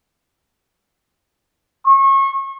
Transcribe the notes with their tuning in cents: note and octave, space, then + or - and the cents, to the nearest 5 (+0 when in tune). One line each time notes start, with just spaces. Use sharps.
C#6 -30